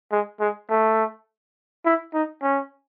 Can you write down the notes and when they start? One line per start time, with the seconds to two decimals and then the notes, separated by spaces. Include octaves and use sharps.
0.12 G#3
0.40 G#3
0.70 A3
1.85 E4
2.14 D#4
2.42 C#4